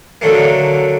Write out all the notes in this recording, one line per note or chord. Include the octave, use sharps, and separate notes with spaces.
D3 F#3 A3 A#3